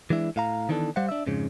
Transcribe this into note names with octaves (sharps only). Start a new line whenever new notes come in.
E3 G#3 D4 E4
A2 F5 A#5
D#3 E3 B3 D4 A4
G3 C5 F5 F#5
D4 E5
F2 G#2 C#3